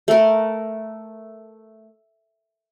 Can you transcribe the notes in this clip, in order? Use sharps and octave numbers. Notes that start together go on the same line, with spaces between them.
A3 A#4